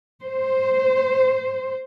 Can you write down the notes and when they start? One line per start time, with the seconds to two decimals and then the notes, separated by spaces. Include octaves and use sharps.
0.23 C5